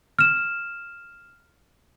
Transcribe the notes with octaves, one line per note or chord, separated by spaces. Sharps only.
F6 E7